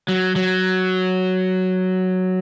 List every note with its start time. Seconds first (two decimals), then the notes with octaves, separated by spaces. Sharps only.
0.08 F#3
0.36 F#3